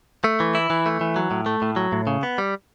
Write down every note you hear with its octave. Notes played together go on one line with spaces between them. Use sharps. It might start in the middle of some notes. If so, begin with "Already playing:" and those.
A3
E3
E4
E3
A3
E3
F#3
A2
A3
A2
F#3
A2
C#3
B3
G3